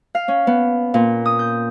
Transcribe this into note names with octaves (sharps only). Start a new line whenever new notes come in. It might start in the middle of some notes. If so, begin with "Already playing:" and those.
F5
C#4
B3
A#2
D#6
G6